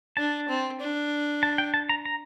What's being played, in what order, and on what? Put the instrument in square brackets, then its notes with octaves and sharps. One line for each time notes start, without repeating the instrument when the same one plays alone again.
[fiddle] D4 [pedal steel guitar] A5
[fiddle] C4
D4
[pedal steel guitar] A5
G5
A5
A#5
A#5